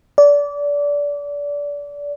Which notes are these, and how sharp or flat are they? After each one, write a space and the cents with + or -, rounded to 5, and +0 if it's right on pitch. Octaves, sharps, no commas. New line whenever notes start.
D5 -25